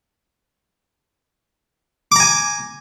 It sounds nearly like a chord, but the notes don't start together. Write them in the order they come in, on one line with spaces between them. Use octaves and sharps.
D6 A#5 G#5